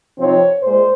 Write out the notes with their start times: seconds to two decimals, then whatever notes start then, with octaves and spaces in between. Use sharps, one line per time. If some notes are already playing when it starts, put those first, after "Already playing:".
0.18 C3 F3 C4 D#4 C#5
0.62 A#2 G#3 C5